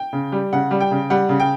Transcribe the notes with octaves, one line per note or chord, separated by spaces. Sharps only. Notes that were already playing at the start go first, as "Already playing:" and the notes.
Already playing: G5
C#3
G3
C#3 F#5
G3
G5
C#3
G3 F#5
C#3
G5